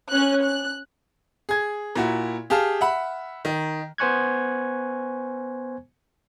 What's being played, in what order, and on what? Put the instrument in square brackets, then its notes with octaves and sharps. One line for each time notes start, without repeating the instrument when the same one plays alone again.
[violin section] C#4 F#6
F#6
[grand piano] G#4 G#6
A#2 E4 F#4
G4 G#4 F5 A5 F6
E5 F#5 B5
D#3
[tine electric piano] B3 C5 G#5 C#6 F#6 G#6